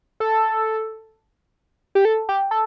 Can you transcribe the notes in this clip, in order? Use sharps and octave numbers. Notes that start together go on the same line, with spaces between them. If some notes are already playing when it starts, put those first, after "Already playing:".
A4
G4
A4
G4
A4